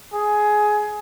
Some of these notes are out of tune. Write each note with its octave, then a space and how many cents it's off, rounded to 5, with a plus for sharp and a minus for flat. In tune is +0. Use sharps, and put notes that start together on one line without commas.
G#4 +15